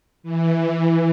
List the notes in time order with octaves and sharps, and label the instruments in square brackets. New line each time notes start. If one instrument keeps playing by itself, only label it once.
[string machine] E3